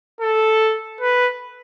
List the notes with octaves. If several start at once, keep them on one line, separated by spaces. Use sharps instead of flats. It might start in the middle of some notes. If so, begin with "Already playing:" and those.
A4
B4